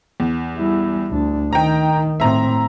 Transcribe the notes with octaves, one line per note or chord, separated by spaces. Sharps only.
E2
G3 E4
D2 D4
D#3 G5 A#5
A2 C4 E5 A#5